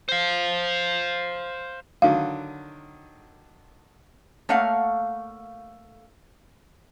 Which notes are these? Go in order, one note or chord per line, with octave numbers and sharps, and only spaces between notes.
C5 F5
D3 D#3 F#3 F5
A3 A#3 C#5 F5 F#5